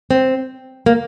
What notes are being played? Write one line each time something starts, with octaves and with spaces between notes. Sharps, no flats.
C4
A#3